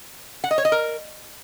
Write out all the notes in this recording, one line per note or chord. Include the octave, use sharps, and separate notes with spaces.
F#5
D#5
C#5
D#5
A#4